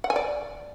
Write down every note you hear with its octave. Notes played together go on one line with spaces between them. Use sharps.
F#5
G#5
D5